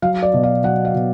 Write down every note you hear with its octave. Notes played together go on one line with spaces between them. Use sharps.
F#3 F5
D5
B2
F5
F#3 F#5
F5
B2